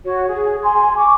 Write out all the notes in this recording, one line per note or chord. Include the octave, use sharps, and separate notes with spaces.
F#4 C#5
G#4
G#5 C6
C#6 D6